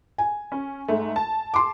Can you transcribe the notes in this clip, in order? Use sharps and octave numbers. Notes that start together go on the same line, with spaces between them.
G#5
C#4
G#2 A3
A5
C6 D6